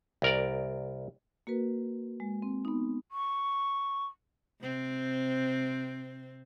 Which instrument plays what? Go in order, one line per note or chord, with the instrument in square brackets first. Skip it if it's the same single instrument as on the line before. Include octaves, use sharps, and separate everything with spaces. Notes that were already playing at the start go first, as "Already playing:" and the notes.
[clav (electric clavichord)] C2 A#4 D5
[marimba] A#3 F#4 A#4 B4
G#3
C4
B3 D#4
[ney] C#6
[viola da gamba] C3 C4